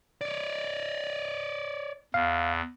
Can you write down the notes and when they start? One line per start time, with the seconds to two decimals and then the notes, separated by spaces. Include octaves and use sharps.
0.21 C#5 D5
2.14 E2 F5